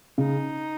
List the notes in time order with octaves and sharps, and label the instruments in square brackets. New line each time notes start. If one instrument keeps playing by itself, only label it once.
[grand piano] C#3 [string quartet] D#4